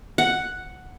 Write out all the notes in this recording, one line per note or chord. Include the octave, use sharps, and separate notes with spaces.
F#5